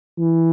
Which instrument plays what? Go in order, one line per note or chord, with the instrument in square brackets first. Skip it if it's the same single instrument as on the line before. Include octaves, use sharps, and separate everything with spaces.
[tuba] E3